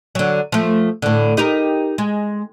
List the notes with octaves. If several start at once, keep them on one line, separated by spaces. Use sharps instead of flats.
D3 F#3
F3 A3
A2 D3
D#4 G4 A#4
G#3